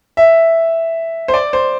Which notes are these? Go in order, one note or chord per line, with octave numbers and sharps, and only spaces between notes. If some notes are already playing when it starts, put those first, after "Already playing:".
E5
C5
D5
C5